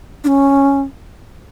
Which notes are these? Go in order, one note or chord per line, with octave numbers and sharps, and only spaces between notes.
D4
C#4